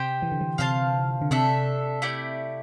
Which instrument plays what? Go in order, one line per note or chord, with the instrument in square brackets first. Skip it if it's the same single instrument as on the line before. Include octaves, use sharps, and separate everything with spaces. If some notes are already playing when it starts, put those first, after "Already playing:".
Already playing: [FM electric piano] C3 [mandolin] G4 C5 G5
[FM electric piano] E3
D3
E3
[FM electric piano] C3 [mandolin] F4 C5 F5 A5
[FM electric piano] D3
[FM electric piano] C3 [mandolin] A3 D4 A4 E5
[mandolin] A3 E4 G4 D5